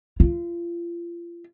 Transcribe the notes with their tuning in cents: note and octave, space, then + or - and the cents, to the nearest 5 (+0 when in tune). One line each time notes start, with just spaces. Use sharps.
F4 -30